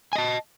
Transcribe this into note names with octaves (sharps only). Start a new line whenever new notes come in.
D#5 G#5 A5